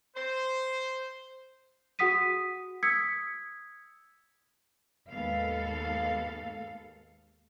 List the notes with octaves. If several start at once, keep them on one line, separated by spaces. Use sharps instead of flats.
C5
F#4 G#4 F#5 D#6 B6 D#7
D#6 E6 G#6 B6 C#7
D#2 G#2 G#3 B3 A4 F5